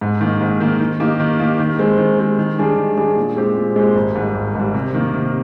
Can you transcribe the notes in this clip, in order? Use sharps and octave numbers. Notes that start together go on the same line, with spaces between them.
G#2
D#3 A#3
G#2
D#3 A#3
D#3
A#3 D#4 G4
D#3
A#3 D#4 G4
D#3
G#3 C4
D#3
G#3 C4
D#3
G3 D4 G#4
D#3
G3 D4 G#4
A#2
G#3 C4 G4 C5
A#2
G#3 C4 G4 C5
G#1
G#2 G3
G#1
G#2 G3
C3
D#3 A#3
C3